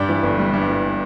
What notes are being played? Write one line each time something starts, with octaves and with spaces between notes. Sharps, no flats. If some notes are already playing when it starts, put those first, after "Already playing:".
Already playing: G2 G3 D5
E3
G1
G3
G2
E3